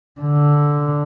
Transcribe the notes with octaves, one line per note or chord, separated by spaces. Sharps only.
D3